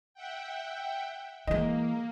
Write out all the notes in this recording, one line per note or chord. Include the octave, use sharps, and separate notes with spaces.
E5 F#5 G5
E3 G#3 A#3 D#5